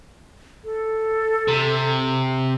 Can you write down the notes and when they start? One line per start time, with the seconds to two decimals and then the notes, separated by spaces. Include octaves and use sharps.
0.64 A4
1.48 C3